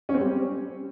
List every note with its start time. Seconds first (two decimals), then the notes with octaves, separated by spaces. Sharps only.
0.09 C#4
0.14 C4
0.20 G3